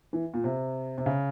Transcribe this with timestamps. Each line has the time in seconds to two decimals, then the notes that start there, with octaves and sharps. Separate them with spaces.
0.13 E3
0.34 A#2
0.44 C3
0.98 C3
1.06 C#3